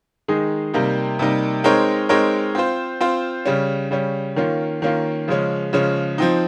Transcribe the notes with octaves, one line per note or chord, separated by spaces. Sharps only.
D#3 G#3 D#4 G#4
C3 G3 A#3 D#4
C3 G3 A#3 D#4
G#3 C4 D#4 A#4 C#5
G#3 C4 D#4 A#4 C#5
C4 F4 C5
C4 F4 C5
C#3 G3 C#4
C#3 G3 C#4
D#3 A#3 C#4 F4
D#3 A#3 C#4 F4
C#3 F3 G#3 C#4
C#3 F3 G#3 C#4
F3 C4 D#4